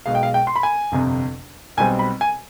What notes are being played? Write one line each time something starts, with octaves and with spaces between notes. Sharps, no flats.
B1 B2 G#3 F5
G5
F5
G5
C6
B5
G#5
G1 F2 C3
B1 B2 G3 C4 G#5
B5
G#5